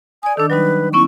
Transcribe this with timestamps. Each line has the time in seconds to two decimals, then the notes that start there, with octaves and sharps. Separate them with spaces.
0.23 D5 G#5 D#6
0.37 D#3 D4 A4
0.50 F#3 G3 D#4 B4
0.93 B3 C#4 E4 C#6